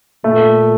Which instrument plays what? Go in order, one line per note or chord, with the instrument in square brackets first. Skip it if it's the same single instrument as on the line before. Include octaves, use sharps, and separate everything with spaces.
[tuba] A#2 [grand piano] A3